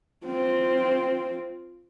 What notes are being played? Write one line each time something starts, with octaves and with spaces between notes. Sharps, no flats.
C4 F4